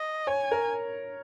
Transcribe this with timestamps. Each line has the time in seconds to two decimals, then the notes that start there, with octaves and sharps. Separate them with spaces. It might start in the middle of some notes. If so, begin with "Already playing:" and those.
Already playing: D#5
0.27 C#5 G#5
0.52 A#4